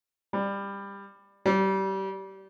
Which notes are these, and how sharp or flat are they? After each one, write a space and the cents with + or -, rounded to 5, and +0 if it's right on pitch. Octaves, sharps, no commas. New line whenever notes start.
G3 +20
G3 -25